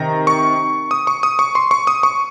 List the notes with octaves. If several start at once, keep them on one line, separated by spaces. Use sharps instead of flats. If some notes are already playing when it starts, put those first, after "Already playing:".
Already playing: C3 D#3 A#5
C#6
D#6
C#6
D#6
C#6
C6
C#6
D#6
C#6